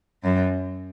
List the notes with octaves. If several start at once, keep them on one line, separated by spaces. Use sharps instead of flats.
F#2